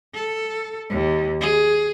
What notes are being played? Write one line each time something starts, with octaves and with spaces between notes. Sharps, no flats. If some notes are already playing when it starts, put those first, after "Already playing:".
A4
D#2
G#4